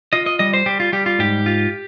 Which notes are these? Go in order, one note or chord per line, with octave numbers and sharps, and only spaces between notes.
F4 D#5
D#5
G3 D#5
C5
G3 G4
F4
G3 G4
F4
G#2 G4
F4